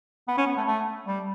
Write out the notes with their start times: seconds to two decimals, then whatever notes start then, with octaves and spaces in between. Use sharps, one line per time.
0.28 B3
0.37 C#4
0.47 B3
0.57 A3
0.67 A3
1.07 G3